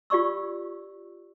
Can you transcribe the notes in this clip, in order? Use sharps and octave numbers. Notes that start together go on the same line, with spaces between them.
F4 G4 D5 C#6 E6